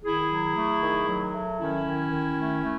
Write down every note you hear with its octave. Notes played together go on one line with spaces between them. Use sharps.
D#3 E4 G#4
F#3
A3
D#3
F#3
A3
D#3 C#4 E4
D#3
D#3
A3
A3